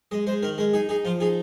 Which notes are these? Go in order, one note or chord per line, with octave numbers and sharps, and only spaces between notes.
G#3 D#5
G#3 C5
D#3 A#4
G#3 A#4
D#4 G#4
D#4 G#4
F3 F4
D#4 G#4